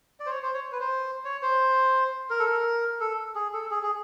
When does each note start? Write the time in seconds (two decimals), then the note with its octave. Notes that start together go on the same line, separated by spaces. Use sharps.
0.20 D5
0.26 C5
0.31 C#5
0.43 C5
0.54 C#5
0.72 B4
0.80 C5
1.25 C#5
1.42 C5
2.30 A#4
2.39 A4
2.47 A#4
3.00 A4
3.35 G#4
3.53 A4
3.71 G#4
3.83 G#4